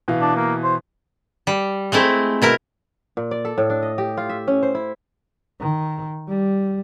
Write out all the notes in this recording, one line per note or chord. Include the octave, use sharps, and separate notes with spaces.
B2 E3 F5
D4
A#3
C5
G3
G#3 A3 C4 E4
B2 E4 A#4
A#2
D5
A4
A2
D4
D#5
G4
F4
E5
C#4
C5
E4
D#3
G3